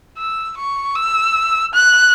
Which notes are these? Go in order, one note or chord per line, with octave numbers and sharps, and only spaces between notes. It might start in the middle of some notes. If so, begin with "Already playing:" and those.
E6
C#6
E6
F#6